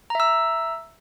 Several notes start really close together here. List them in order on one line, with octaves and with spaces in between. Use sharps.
A#5 E5 E6